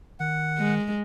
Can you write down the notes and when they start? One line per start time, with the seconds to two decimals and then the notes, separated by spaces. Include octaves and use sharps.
0.20 D#3 F#5
0.59 G#3